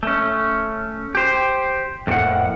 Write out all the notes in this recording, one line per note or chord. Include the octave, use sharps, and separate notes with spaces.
A3 C#4
G4 C5
F2 A2 C3 A#3 F#5